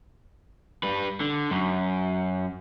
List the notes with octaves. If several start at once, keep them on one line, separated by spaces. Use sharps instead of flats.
G3 B4
D3
F#2